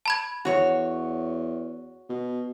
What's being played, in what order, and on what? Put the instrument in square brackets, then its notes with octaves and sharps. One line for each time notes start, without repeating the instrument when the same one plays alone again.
[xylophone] A5 B5 G#6
[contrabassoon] E2 [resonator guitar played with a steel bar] F#4 C#5
[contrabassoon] B2